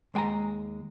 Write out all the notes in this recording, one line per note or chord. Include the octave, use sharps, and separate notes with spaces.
D#2 G#3 G5 G#5 A#5